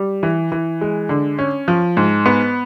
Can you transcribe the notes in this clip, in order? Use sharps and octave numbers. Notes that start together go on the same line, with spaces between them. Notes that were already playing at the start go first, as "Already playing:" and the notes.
Already playing: G3
E3
E3
G#3
D3
C#4
F3
G#2
B3